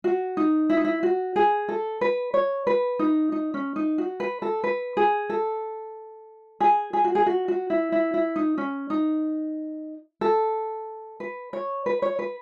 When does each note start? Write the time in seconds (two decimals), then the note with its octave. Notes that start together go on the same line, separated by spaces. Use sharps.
0.04 F#4
0.37 D#4
0.70 E4
0.77 D#4
0.84 E4
1.03 F#4
1.36 G#4
1.69 A4
2.01 B4
2.34 C#5
2.67 B4
2.99 D#4
3.32 D#4
3.54 C#4
3.76 D#4
3.98 F#4
4.20 B4
4.42 A4
4.64 B4
4.97 G#4
5.30 A4
6.60 G#4
6.93 G#4
7.04 F#4
7.15 G#4
7.26 F#4
7.48 F#4
7.70 E4
7.92 E4
8.14 E4
8.36 D#4
8.58 C#4
8.90 D#4
10.21 A4
11.20 B4
11.53 C#5
11.86 B4
12.02 C#5
12.19 B4